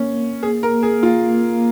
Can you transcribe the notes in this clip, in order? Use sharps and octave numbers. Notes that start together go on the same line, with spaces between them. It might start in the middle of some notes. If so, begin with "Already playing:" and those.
Already playing: A#3 C#4
G#4
A#4
G#4
F4